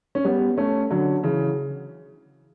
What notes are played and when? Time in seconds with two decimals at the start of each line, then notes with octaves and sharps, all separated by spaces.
0.15 C#4
0.24 G3 B3
0.57 A3 C#4
0.90 D3 F#3
1.23 C#3 E3